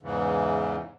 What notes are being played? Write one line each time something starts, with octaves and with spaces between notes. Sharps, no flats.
E2 G#2 C#3 E3